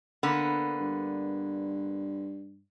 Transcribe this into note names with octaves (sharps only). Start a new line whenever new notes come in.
D3 A#3 B3
G2